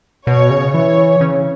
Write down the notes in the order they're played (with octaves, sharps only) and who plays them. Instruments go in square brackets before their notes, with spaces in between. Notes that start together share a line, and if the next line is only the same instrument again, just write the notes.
[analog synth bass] B2 [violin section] C#5
[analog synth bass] C#3
[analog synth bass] E3 [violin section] C#5
[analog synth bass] C#3